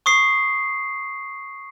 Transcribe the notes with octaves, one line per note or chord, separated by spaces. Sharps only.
C#6 D#6 C7